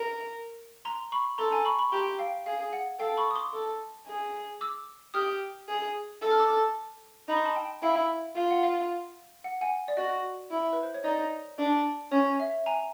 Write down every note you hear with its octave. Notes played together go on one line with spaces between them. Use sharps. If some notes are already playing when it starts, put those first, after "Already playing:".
Already playing: A#4
A#5 C6
B5 C#6
A4 A#5 C6
G#5 A#5
B5 C#6
B5 C#6
G4 A#5 C6
F5 G5
G#4 F5
F#5
A4 F5 G5
B5 C#6
D#6
C6 D6
A4
G#4
D6 E6
G4 D#6 F6
G#4
A4 E6
F6
D6 E6
D#4 B5
C6
A5 B5
G5 A5
E4 F5 G5
F4 F5
F#5
F5
F#5
F#5 G#5
D5
F#4 D#5
E4
B4
C5
C#5
D#4 D5
D4
C#4 C#5
E5
G#5 A#5